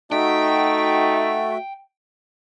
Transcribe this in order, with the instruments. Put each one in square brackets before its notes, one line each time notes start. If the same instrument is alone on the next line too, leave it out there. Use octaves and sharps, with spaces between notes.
[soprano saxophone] A3 [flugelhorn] D#4 [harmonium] F#4 E5 [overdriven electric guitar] G5